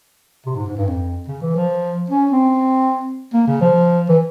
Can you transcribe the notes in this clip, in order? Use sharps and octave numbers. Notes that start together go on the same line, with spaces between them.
C3
G#2
G#2
G2
F2
C#3
E3
F3
C#4
C4
A#3
C#3
F3
E3